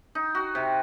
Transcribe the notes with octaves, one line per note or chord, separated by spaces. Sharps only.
D#4
F#4
C3